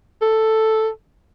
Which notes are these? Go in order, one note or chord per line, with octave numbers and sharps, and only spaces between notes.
A4